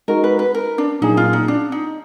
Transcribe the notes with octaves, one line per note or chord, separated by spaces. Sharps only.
G#3 D#4 F#4 A#4
B4
B4
A#4
D4
A#2 F#3 A#3 D4 D#4 G#4
F4
D#4
D4
D#4